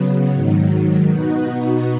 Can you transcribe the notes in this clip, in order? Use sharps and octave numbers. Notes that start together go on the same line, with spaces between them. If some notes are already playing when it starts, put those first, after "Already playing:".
Already playing: C#3 F#3 B3
G#2 D#3 F#3
B2 B3 D#4 F#4